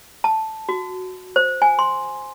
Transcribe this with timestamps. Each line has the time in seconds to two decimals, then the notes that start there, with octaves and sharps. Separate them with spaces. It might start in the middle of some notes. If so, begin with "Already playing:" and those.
0.24 A5
0.69 F#4
1.36 C5
1.62 G#5
1.79 C6